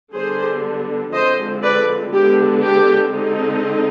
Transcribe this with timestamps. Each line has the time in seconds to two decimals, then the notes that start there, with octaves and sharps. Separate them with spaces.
0.14 D3 G3 B3 D4 G#4 C5
1.14 D3 F3 G#3 C4 C5 D#5
1.63 B4 D5
2.12 D3 G#3 B3 D4 G4
2.63 G4
3.12 D3 G#3 C4 D#4